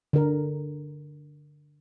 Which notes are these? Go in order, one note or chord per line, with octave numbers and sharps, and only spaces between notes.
D3 A#4